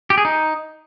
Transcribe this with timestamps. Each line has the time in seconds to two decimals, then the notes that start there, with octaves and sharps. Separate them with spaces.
0.10 G4
0.18 G#4
0.25 D#4